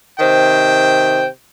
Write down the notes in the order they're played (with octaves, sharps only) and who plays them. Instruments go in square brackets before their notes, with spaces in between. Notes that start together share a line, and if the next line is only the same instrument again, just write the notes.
[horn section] C3 D#3 C5 G5